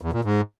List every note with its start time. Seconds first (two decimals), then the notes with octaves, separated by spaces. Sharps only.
0.01 E2
0.13 A#2
0.24 G#2